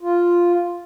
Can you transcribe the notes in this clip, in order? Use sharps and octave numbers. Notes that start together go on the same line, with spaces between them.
F4